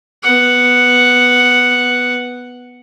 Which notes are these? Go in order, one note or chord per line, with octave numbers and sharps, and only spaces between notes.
B3 F#5